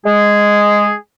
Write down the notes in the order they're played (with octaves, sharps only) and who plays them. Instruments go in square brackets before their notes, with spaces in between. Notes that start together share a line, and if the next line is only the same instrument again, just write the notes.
[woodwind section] G#3 G#4